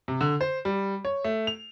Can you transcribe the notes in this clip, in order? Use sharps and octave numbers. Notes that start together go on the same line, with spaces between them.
C3
D3
C5
G3
C#5
A3
F7